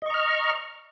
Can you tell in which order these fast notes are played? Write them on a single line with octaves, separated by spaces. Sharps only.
D#5 C#6 A#5 F6